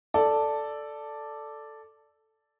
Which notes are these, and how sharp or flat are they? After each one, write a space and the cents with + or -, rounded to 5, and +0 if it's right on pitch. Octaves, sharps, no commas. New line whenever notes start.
A4 +0 D5 +0